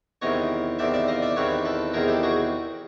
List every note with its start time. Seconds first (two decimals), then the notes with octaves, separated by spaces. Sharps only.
0.22 E2 C3 D#3 C#5 D#5
0.79 E2 C3 D#3 D5 E5
0.94 D5 E5
1.08 D#5 F5
1.22 D5 E5
1.36 E2 C3 D#3 B4 C#5
1.65 A4 B4
1.94 E2 C3 D#3 G#4 A#4
2.08 G4 A4
2.23 F#4 G#4